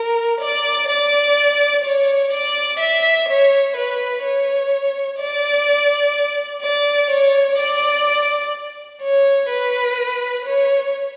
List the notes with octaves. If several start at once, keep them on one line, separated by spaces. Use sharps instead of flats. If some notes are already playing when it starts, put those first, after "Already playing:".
Already playing: A#4
D5
D5
C#5
D5
E5
C#5
B4
C#5
D5
D5
C#5
D5
C#5
B4
C#5